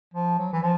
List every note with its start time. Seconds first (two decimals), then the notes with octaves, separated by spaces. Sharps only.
0.14 F3
0.38 F#3
0.53 E3
0.62 F3